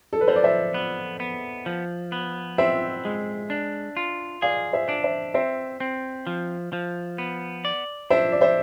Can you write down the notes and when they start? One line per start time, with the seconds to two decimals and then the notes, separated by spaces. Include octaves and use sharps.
0.13 A4
0.21 B4
0.28 F3 C5
0.36 D5
0.44 C5 E5
0.74 B3
1.20 B3
1.66 F3
2.12 B3
2.58 C4 C5 E5
3.05 G#3
3.50 D4
3.97 F4
4.42 G#4 D5 F5
4.73 C5 E5
4.89 D4
5.04 C5 E5
5.34 C4 C5 E5
5.80 C4
6.27 F3
6.73 F3
7.18 B3
7.65 D5
8.10 D4 C5 E5
8.32 D5
8.41 C5 E5